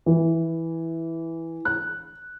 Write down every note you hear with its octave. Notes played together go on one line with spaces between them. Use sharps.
E3
F#6